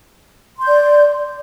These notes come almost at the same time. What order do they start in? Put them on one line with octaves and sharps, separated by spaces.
C6 G6 D5